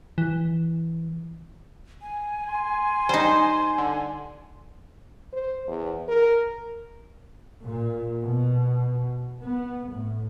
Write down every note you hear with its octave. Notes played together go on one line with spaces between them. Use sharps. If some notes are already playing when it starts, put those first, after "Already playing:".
E3
G#5
C6
G3 D#4 C5
D3
C5
E2
A#4
A#2
B2
B3
A2